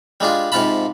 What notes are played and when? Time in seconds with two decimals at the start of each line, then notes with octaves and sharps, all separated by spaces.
0.20 G3 G#3 D4 F4
0.52 G#2 C3 F4 F5 A5 B5